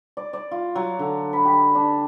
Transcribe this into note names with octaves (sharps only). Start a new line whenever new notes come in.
D5
D5
F4
F#3
D3
B5
G4
D4